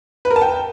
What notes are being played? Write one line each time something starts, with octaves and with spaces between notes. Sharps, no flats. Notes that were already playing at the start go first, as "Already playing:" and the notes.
B4
A#4
A5
G5